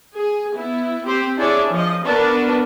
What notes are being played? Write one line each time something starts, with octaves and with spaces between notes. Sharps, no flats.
G#4
B3 E4
C4 G4 C5
D4 E4 G#4 C#5 D5
F3 D#5
B3 D4 F#4 A#4 B4